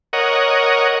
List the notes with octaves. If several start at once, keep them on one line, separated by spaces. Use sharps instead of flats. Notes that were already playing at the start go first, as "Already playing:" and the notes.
A#4 C#5 D#5 F#5